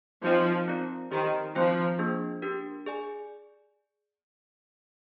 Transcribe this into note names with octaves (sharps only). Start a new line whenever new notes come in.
F3 C4 D#4 A#4 D#5 G5
C4 F4 A#4 D5
D#3 G4 C5 G5
F3 C4 F4 C5 G5
A#3 D4 G#4
D4 G4 A#4
G#4 D5 G#5